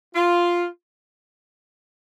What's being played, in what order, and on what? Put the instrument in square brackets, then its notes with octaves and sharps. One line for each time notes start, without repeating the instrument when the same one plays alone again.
[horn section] F4